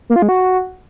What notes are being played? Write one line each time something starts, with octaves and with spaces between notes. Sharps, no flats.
A#3
F4
G#3
F#4